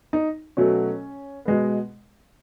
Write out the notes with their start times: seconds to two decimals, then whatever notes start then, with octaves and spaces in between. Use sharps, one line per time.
0.13 D#4
0.57 B2 F#3 A3 C#4
1.45 B2 G#3 B3